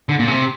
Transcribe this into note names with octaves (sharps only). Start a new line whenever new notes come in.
D3
A#2
C3